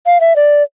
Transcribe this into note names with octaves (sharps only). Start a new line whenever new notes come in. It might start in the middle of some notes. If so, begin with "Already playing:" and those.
F5
E5
D5